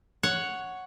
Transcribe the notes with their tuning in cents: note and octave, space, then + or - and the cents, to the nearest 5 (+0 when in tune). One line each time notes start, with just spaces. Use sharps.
C#5 +5 F#5 +0